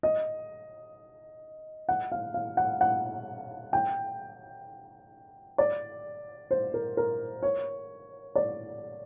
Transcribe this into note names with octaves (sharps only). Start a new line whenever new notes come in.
D#5
F#5
F5
F5
F#5
F#5
G5
D5
C5
A#4
A#4
C#5
D5